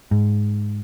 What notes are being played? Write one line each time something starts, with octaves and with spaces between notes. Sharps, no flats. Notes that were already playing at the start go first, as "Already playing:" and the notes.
G#2